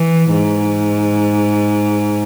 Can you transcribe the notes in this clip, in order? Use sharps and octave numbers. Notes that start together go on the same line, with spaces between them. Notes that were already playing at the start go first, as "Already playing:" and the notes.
Already playing: E3
G#2